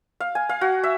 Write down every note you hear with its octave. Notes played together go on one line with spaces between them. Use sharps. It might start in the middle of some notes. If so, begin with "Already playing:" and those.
F5
G#5
F5
F#4
E5